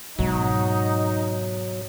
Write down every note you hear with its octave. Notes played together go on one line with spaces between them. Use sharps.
G#2 B2 F#3 D#4